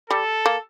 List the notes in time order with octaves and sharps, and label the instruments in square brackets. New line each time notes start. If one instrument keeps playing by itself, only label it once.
[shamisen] G3 [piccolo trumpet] A4
[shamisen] A#3